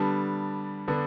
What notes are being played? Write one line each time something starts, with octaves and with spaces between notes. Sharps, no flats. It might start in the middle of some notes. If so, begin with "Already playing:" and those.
Already playing: D3 G3 B3 D4 A5
D3 B3 D4